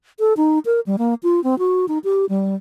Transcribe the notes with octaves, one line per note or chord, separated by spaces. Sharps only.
A4
D#4
A#4
G3
A#3
F4
C4
F#4
D#4
G4
G3